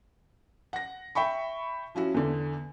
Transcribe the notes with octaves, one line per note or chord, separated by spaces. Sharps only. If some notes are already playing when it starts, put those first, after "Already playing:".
F#5 A#6
E5 G5 B5 C#6
F3 C#4 E4 F#4
E2 D3